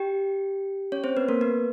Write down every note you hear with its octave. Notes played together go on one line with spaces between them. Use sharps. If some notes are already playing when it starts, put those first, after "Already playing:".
Already playing: G4 G5
C#4 C#5
C4 C5
B3 B4
A#3 A#4
B3 B4